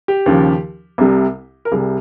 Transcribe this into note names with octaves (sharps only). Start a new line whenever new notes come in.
G4
D#2 C#3 F3
C2 C3 G3
A#4
C2 C3 G3 G#4